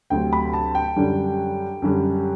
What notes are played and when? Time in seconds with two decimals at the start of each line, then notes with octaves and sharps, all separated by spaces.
0.10 D2 C3 F#3 G5
0.33 B5
0.53 A5
0.75 G5
0.96 F#2 D3 G3
1.82 F#2 D3 G3